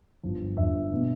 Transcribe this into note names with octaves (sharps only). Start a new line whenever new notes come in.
G1 G2 F3
G1 G2 F3 E5
B2 B3 D4